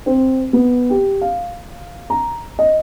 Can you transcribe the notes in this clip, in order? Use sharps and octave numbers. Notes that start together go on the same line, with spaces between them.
C4
B3
G4
F5
A#5
D#5